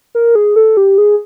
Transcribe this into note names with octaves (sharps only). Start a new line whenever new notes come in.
A#4
G#4
A4
G4
G#4